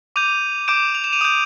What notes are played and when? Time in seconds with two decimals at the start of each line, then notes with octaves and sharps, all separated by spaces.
0.16 D6 G6 D#7 F7
0.68 D6 G6 D7 E7
0.95 F7
1.04 E7
1.13 D#7 F7
1.21 D#6 G6